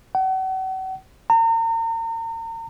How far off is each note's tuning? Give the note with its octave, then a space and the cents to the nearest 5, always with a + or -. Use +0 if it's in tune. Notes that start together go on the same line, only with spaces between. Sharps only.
F#5 +40
A#5 -40